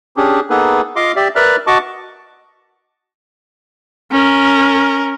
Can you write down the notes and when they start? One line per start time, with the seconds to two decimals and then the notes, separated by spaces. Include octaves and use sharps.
0.17 C#4 D4 G4 G#4
0.50 A#3 B3 D#4 G#4 A4 B4
0.96 F4 D#5 F5 C6 D6
1.16 G4 D5 E5
1.36 A#4 B4 D5 E5 F6 F#6
1.67 F#4 D#5 A5 C#6 D6
4.11 C#4 A#4